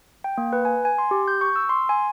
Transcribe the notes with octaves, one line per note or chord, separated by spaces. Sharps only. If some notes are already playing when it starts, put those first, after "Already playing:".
G5
A#3
B4
G#5
G#5
C6
G4
G6
C#6
E6
C6
G#5